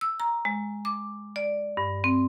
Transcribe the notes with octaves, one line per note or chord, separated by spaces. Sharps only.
E6
A#5
G#3
D6
D5
G2
C4